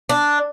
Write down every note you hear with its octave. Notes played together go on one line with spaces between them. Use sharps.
D4